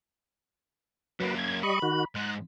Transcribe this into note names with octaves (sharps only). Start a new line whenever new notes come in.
F#2 F#3 A#3 B4
G#6
G3 D#5 B5 C#6
D#3 F#4
G#2 G#3 F#6